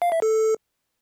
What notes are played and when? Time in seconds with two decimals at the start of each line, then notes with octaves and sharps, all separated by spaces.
0.02 F5
0.12 E5
0.22 A4